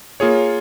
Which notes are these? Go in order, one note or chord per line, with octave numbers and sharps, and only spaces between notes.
A#3 F4 G#4 C#5